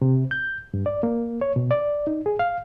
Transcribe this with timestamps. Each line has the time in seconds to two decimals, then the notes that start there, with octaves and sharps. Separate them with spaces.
0.02 C3
0.31 G6
0.74 G2
0.86 D5
1.03 A#3
1.41 C#5
1.56 B2
1.71 D5
2.07 D#4
2.26 G#4
2.39 F5